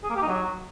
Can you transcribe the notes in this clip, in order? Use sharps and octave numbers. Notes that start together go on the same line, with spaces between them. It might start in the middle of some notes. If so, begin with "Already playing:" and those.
G#4
A#3
G4
D#4
F#3